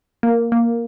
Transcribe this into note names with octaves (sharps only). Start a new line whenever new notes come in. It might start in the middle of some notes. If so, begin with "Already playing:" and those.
A#3
A#3